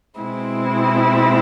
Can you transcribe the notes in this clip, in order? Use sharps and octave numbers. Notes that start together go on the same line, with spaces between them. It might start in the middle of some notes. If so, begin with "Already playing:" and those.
B2 G#3 C4 E4